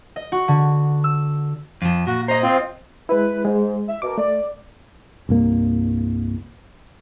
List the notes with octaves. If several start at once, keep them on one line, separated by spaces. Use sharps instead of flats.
D#5
F#4
D3
E6
F2 F3
A#2 F#4
C5 D#5 A#5
C4 F4
G#3 E4 B4
G#2 G#3
E5
B2 A#4 D6
A3 D5
C2 G2 A#3